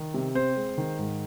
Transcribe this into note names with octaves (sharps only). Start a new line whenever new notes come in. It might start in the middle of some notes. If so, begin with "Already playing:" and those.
Already playing: D#3
C3
C4 C5
G#3
D#3
G#2